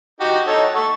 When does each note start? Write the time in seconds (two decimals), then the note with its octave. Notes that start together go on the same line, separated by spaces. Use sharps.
0.20 D#4 F#4 G4
0.47 D#4 A4 C#5
0.63 F#5
0.75 A4 C#6